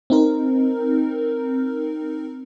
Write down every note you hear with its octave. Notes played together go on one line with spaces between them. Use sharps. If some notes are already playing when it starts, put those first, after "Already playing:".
C4 D#4 A#4